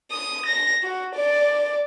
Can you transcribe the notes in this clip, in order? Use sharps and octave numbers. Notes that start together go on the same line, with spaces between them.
D#6
A#6
F#4
D5